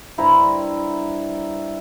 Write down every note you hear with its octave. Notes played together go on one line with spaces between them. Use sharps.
G2 E4 C5 A#5